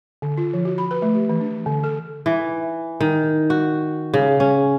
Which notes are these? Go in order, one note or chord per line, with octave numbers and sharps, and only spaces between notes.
D3
F4
F3
F#4
B5
B4
A3
G4
E3
D4
D3
A4
E3
D#3
F#4
C#3
C#4